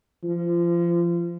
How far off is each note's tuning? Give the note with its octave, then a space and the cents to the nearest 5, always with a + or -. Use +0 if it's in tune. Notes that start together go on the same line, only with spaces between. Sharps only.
F3 -25